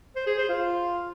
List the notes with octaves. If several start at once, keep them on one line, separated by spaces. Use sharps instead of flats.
C5
G#4
C5
F4